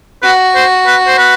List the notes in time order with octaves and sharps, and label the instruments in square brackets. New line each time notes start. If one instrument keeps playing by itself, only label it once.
[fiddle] F#4 [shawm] B4
[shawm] C5
B4
C5
B4